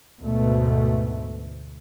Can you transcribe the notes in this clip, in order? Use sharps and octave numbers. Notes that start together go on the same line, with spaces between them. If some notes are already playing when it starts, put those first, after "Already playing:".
D2 G#2 B2 A3